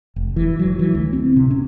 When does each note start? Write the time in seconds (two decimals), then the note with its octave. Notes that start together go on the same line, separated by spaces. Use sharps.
0.16 F1
0.36 E3
0.59 F#3
0.79 E3
0.95 D2
1.13 C4
1.36 C3
1.50 C#4